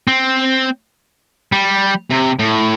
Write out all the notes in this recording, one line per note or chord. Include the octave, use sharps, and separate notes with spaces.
C4
G3
C3
A2